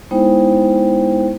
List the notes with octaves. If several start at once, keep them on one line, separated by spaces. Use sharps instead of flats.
G#3 B3 D#4 E4 C5 G5